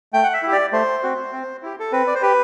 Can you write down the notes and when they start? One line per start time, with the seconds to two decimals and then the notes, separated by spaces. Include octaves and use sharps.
0.13 A3 G5
0.24 F#5
0.33 E5
0.43 E4 G4
0.52 D5
0.72 A3 C5
1.03 C4 F#4
1.32 C4
1.63 E4 G4
1.80 A4
1.92 C4 B4
2.07 D5
2.15 C5
2.22 G4 B4